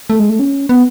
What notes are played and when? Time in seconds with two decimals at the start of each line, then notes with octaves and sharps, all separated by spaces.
0.10 A3
0.19 G#3
0.29 A3
0.39 C#4
0.69 B3